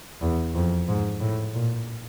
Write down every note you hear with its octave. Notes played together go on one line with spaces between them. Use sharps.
E2
F2
G#2
A2
A#2